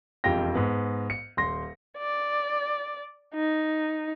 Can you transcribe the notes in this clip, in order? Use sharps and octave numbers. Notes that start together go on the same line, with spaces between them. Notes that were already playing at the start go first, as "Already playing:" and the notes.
E1 F2 F4 G4 G5 A#6
G#2 B3
C#7
D#1 C6 A#6
D5
D#4